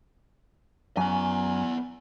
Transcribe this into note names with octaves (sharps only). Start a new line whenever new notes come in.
F#2 B3 G#5